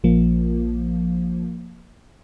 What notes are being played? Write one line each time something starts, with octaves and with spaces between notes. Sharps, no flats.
A#1 F3 A#3